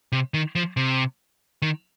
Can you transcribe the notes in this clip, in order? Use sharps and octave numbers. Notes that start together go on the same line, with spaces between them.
C3
D#3
F3
C3
D#3